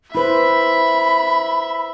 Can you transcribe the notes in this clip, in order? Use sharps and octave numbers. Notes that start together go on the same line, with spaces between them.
E4 B4 C5 E5 B5